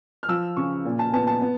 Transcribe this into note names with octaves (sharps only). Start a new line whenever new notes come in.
F6
F3 E6
C#3 C#6
A#2
A5
B3 A5
A5
B3